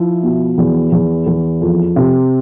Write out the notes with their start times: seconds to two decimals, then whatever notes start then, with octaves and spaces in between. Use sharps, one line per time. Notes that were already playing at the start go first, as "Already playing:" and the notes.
Already playing: F3 E4
0.23 B2
0.58 E2
0.92 E2
1.26 E2
1.61 F2
1.96 C3